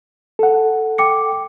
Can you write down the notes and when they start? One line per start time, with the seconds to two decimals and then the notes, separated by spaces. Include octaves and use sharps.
0.39 A4 F#5
0.98 G5 D6 C#7